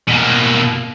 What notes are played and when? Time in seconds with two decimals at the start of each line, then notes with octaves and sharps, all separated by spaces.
0.08 B2 A#3